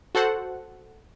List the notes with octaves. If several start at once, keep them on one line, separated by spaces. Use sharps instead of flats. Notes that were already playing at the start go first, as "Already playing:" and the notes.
F#4 A4 C5 F#5